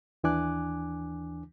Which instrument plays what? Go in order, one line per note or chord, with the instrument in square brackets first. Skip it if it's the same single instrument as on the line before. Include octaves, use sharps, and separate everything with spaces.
[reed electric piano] D#2 E3 D4 G#5 D6 F#6